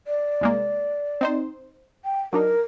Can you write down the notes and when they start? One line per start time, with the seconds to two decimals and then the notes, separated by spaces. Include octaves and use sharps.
0.07 D5
0.41 C2 G#3 A#3
1.21 C4 D#4 C5
2.05 G5
2.33 F#3 D4 D#4 A#4